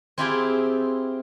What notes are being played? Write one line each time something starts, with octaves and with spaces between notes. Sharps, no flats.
C4 E4 F4 G4 G#4 G5